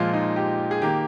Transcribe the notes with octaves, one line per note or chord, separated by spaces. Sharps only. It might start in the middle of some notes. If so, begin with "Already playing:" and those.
Already playing: A#2 F3 G#3 F4
D#4
G4
G#4
D#3 A#3 G4